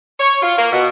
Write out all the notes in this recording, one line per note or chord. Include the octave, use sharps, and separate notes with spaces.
C#5
F4
A#3
B2